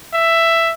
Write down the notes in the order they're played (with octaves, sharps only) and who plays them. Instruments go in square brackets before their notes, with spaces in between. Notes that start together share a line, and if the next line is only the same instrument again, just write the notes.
[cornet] E5